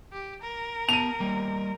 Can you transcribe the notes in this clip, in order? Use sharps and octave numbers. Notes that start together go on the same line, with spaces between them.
G4
A#4
B3 A5 D#7 F7
G3 A#3